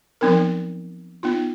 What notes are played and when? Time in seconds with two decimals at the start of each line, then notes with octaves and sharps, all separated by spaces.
0.21 F3 F#3 B3 C4 D#4 A#4
1.23 B3 D#4 F4